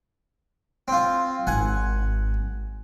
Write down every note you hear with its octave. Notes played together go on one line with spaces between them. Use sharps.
C4 F4
G#1 F#5 G#5